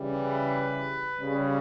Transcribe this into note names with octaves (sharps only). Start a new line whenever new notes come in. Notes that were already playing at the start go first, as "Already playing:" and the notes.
Already playing: C#3 E3 G3
B4
C#3 G3